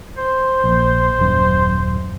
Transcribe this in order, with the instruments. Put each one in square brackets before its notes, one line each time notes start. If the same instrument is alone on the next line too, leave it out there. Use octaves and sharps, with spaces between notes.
[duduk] C5
[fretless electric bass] A#1
D#1 F#2